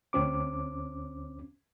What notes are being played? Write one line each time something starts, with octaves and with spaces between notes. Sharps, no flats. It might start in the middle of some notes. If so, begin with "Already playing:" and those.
D2 C4 C#4 D6